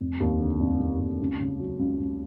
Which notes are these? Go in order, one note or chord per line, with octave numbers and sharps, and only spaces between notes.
F1
D#2
D3
F1
F1
D#2
C#2
C#3
F#3
C#2
C#2